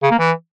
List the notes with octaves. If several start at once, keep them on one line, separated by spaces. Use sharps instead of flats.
C#3
A#3
E3